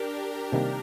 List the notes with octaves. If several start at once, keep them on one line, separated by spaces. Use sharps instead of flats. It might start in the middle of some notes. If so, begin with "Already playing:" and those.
Already playing: D4 G4 A#4
C3 D#3 G3 A#3